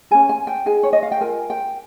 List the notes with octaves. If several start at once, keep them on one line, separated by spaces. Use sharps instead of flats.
C#4 G#4 G#5
G#5
G5
D#4 G#4 G#5
C#5
D#5
F5
G5
F4 A#4 G#5
G5